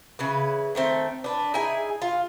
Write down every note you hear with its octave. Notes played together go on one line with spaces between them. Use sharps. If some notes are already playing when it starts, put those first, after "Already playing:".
C#3 E3 B4
D#3 A3 C4
D4 B4
D#4 E4 G#4 G#5
F4